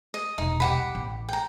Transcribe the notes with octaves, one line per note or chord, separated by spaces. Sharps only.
D#5
E1 C2 D#4
G4 F#5 B5
A1
G5 A#5